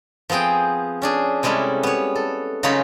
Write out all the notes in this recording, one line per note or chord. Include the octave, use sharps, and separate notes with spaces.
F3 B3 C4 G#4 G5
C#4 D4 G#4
C3 G3 G#3 C#4 E4 A4
B3 C#5
A4
C#3 F#3 D#4 F4 C#5 B5